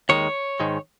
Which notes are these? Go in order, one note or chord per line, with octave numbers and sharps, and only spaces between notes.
D#2 D#3 G#3 C#5
G#2 D#3 G#3